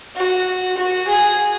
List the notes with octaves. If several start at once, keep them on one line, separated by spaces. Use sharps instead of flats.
F#4
F#4
G#4